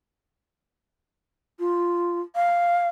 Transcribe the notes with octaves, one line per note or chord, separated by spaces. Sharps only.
F4
F5